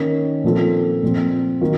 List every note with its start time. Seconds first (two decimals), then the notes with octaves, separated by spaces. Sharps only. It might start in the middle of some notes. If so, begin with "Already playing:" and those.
Already playing: D#3 A#3 C#4
0.44 A#2 F3 C4 F4 A4
1.03 A#2 F3 C4
1.61 D#3 F#3 A#3 F4